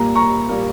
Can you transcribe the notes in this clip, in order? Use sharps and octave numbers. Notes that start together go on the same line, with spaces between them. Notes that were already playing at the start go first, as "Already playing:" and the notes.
Already playing: A#2 G3 A#3 A#5
A#5 C#6
A#2 G3 A#3